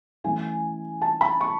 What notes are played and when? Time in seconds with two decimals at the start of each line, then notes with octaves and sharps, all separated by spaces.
0.24 E3 A3 C#4 E4 G#5
1.02 A5
1.21 B5
1.41 C#6